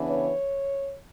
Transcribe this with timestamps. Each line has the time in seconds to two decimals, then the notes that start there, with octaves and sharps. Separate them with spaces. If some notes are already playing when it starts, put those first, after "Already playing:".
Already playing: C#3 E3 B3 D4
0.09 C#5